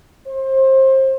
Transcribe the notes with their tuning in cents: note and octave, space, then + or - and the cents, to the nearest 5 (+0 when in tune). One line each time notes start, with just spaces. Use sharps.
C5 +25